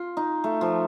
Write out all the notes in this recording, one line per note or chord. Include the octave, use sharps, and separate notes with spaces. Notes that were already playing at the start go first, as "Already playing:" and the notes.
Already playing: F4
D#4
A3
F3